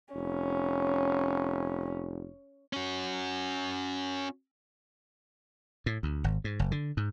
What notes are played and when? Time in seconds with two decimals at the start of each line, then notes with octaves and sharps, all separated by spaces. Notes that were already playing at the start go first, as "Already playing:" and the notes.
0.14 F1 C#4
2.73 C#4 F#4
5.86 A2
6.03 D2
6.24 G#1
6.44 G#2
6.59 F#1
6.72 D3
6.97 G#2